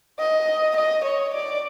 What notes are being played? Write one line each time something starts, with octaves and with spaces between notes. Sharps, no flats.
D#5
D#5
C#5
D5